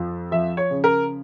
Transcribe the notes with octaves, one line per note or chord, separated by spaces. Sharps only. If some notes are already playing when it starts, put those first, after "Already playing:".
Already playing: F2 F3
F3 E5
C#5
C#3
A#4